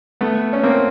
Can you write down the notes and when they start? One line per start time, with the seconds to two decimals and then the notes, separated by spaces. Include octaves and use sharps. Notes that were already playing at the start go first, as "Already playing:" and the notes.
0.21 A3 B3
0.53 C#4
0.63 A#3 C4